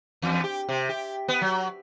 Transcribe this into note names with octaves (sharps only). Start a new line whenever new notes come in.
E2
G4
C3
G4
B3
F#3